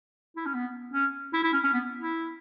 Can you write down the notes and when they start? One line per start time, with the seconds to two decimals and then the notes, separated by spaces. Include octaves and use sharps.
0.37 E4
0.46 C#4
0.54 B3
0.93 C#4
1.33 E4
1.43 E4
1.53 C#4
1.63 C#4
1.73 B3
1.99 E4